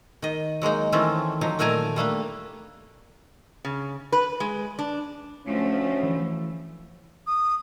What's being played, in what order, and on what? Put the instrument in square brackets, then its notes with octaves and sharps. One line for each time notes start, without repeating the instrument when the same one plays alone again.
[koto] D#3 D#5
F#3 G#3 A#3 D#4
D#3 E3 A3 C4 C#4
F3 F#3 D#4
A#2 D#3 A3 D5 G#5 A#5
G3 A3 A#3 D4
[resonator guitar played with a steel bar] C#3
B4
G#3
D4
[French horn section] D2 C#4 [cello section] F3 A3
[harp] E3
[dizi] D#6